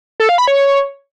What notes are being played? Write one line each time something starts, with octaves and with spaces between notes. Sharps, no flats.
A4
F5
B5
C#5